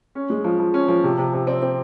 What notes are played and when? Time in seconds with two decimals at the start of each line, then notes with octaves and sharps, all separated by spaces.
0.15 C#4
0.30 G#3
0.44 F3
0.60 F3
0.74 C#4
0.88 F3
1.03 C3
1.18 C3
1.33 C3
1.47 C4
1.62 C4